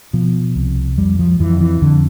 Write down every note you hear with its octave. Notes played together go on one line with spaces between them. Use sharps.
B2 F3
C2
F2 G3
F3
F2 E3
E3
F2 D3